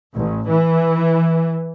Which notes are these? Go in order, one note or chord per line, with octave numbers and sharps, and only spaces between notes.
A1
E3